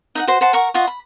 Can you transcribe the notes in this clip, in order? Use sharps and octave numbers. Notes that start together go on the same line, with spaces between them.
D#4 E5 F#5
F#4 C5
C5 F#5 A5
A#4 F#5 C#6
F4 D#5 F#5 C#6
B5